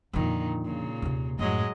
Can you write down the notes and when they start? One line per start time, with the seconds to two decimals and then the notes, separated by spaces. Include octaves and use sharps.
0.13 F2 A#2 D3 D#3
0.65 A#2 C#3
1.02 D#2 C3
1.39 F#2 A2 F#3 G#3 D#5